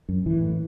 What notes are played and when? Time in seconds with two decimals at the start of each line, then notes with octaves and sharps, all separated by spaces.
0.09 F#2
0.26 A1 E3
0.42 A2